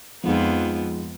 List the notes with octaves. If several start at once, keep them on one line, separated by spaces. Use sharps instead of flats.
F2 F3 G#3 B3 D#4